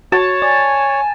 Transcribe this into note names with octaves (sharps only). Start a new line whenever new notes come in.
F#4 C#5 A5
D5 G#5